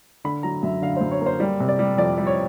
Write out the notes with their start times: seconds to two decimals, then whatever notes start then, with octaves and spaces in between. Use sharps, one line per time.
0.24 D3 B5
0.43 F#3 A#5
0.63 F#2 E5
0.82 D3 F5
0.97 C5
1.01 F#2
1.12 C#5
1.21 A#3
1.26 C5
1.40 G3
1.60 C3
1.69 D5
1.79 G3
1.98 F2 D5
2.18 G3
2.27 C#5